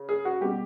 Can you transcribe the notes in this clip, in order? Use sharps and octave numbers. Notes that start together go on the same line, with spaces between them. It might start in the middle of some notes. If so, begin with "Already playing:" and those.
Already playing: C#3
G#4
F#4
B2 G3 G4